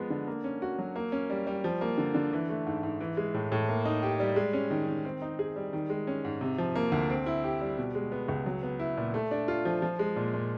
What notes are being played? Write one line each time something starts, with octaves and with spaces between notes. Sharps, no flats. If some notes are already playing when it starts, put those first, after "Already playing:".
Already playing: F3 G#3 B3
D3
A#3
C#4
F#4
F#3
A#3
C#4
G3
G3
F3
A#3
D3
D3
E3
A3
G#2
G#2
E3
G#3
A2
A2
A#3
D#4
G4
G3
G#3
C#4
D#3
D#3
C4
D#4
G#4
G3
D#3
G#3
C#4
G#2
C3
F3
A#3
D2
C4
E4
G4
G3
B2
G#3
B3
C#2
F#3
B3
E4
A#2
A3
D4
F4
F3
F3
G#3
A#2
A#2